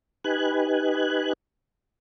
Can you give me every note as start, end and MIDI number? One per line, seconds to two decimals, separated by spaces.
0.24 1.33 63
0.24 1.33 67
0.24 1.33 71
0.24 1.33 80
0.24 1.33 90